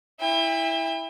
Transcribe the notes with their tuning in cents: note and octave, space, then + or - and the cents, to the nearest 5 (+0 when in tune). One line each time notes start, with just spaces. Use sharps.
E4 +0 G5 +40